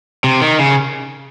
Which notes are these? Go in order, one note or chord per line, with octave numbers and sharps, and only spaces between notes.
C3
D#3
C#3